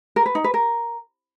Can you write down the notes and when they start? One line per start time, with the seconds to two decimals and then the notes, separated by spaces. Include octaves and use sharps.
0.16 A#4
0.26 B4
0.35 D#4
0.44 B4
0.54 A#4